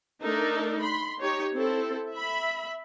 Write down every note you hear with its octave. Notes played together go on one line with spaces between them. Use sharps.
A3 D4 D#4 A4 A#4
B5 C6
D#4 G4 C#5
C4 E4 A4
E5 B5